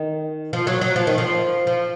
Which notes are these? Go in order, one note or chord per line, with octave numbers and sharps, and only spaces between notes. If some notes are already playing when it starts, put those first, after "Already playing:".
Already playing: D#3
F3
F#3
F#3
F3
D#3
F3
F3